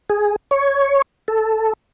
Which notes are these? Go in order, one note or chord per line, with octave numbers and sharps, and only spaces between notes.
G#4
C#5
A4